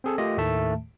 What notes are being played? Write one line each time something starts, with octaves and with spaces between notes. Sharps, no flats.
C4 G#4 A4
A3 F4 G4 A#4 D#5
D#2 A2 D#3 A3 E5 A5